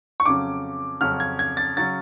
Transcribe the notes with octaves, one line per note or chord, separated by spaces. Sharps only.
C#6
F2 C#3 F#3 C#4 D6
F2 C#3 F#3 C#4 F6
G#6
G#6
A6
C#3 F#3 C#4 A6